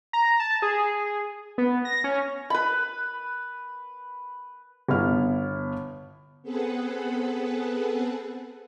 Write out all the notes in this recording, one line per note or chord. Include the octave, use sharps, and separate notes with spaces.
A#5
A5
G#4
B3
A#6
C#4
B4 B5
G1 B3 E4 F6
B3 C4 G#4 A4 B4 F#5